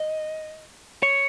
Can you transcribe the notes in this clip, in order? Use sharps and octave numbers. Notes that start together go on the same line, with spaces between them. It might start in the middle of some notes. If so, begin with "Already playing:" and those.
Already playing: D#5
C#5